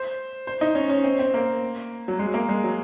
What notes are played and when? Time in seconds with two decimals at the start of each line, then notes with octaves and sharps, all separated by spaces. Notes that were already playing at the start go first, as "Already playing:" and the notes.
Already playing: C5
0.47 C5
0.61 D#4
0.75 C#4
0.89 C#4
1.04 C4
1.19 C4
1.34 A#3
2.08 F#3
2.19 G#3
2.34 A#3
2.49 G#3
2.64 F#3